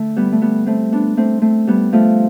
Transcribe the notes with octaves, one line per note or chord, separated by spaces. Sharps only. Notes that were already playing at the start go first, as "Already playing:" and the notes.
Already playing: D3 A3
G3 B3
A3
G3 B3
A3 C4
B3 D4
A3 C4
A3 C4
G3 B3
F3 A3